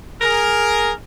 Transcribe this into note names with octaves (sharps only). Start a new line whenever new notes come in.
G#4 A#4